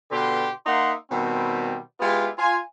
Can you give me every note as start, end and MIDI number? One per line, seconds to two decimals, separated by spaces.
0.11 0.48 47
0.11 0.48 50
0.11 0.48 67
0.11 0.48 71
0.11 0.48 84
0.65 0.93 58
0.65 0.93 63
0.65 0.93 76
0.65 0.93 78
0.65 0.93 84
1.10 1.77 47
1.10 1.77 51
1.10 1.77 55
1.10 1.77 60
2.00 2.28 56
2.00 2.28 59
2.00 2.28 64
2.00 2.28 65
2.00 2.28 67
2.38 2.58 65
2.38 2.58 80